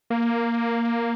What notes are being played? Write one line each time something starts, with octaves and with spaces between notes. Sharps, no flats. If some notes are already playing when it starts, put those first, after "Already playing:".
A#3